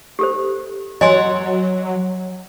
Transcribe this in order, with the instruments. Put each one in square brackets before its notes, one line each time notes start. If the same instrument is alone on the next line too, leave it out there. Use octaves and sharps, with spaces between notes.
[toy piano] G4 A4 C5
[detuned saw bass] F#3 [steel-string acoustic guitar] C#5 F#5 [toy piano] D#5 G#5 C6